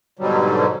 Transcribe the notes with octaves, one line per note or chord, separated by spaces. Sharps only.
G#2 B2 D3 F#3 G3